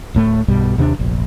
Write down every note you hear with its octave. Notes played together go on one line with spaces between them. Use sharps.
D1 A2 A3
B1 G2 B2 G3
D#2 C3 C#4 D4
F1 A#1